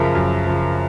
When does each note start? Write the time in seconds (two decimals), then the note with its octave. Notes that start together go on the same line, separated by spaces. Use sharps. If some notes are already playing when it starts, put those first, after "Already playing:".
Already playing: F#2 C#3 F3 A#4 E5
0.15 F#2
0.46 C#3 F3